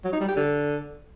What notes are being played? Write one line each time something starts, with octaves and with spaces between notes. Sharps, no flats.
F#3
D#4
G3
G4
D3